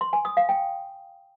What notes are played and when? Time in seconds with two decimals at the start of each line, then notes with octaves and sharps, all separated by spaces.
0.01 C6
0.13 G#5
0.25 D#6
0.37 F5
0.49 G5